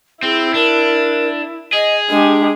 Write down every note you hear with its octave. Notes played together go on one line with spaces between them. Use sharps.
C4 E4 G#4
D4 A#4
G#4 D#5
G#3 D4 G4